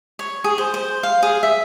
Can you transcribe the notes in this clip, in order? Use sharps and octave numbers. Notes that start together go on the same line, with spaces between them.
C#5
G#4
C5
C5
F5
G#4
E5